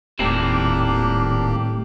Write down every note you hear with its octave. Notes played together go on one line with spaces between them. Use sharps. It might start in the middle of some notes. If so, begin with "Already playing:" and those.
D#1 A2 A#3 C4 D4 E4 G4